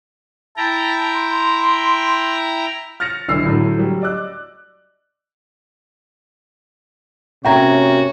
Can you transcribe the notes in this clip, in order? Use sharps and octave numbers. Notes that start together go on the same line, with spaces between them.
E4 G5 A5 A#5
C6
F6 A6 A#6 C#7 F7
D#1 B1 D3 E4 E6 C7
A2 D3 F#3 A3
F#3 G3
D5 D#5 D6 E6 F#6
C3 A#3 C#4 F#4 E5 G5 A#5 G#6